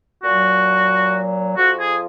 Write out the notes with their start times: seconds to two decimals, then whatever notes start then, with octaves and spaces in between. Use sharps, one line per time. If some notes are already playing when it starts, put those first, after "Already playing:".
0.24 A#2 F#3 F#4
1.56 F2 F3 F#4
1.79 G#4